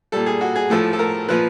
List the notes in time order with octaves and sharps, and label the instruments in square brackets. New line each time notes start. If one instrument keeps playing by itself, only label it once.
[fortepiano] A#2 G3 A4
G#4
F#4
G#4
A2 F3 A4
A4
A#4
A#2 F3 B4